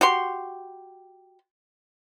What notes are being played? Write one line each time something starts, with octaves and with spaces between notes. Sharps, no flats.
F#4 G4 C6